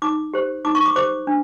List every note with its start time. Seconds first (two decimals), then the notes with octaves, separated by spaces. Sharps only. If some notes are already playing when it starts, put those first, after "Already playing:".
0.02 D#4 D6
0.34 G4 C5
0.65 D#4 D6
0.75 C#6
0.86 D6
0.96 G4 C5 D6
1.27 D4